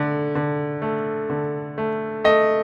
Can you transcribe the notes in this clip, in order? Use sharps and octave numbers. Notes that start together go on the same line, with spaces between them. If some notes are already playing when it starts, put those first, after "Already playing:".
Already playing: D3 A3
D3
A3
D3
A3
A3 D#5